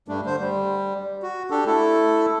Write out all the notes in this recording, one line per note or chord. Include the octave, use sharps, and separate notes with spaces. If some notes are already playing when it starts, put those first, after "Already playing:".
G2 G3 A3 D4
D3 C5
G3
F#4
D4 G4 A4
A3 E4 A4